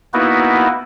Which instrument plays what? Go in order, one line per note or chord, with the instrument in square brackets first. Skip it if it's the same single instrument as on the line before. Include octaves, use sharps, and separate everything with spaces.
[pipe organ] A#3 B3 D#4 E4 F#4 B4